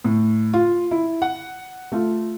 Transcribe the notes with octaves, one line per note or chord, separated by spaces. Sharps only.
A2
F4
E4
F#5
A3 F4